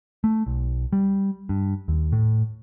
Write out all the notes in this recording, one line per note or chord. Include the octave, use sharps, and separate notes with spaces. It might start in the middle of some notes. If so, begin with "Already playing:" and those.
A3
B1
G3
G2
D#2
A2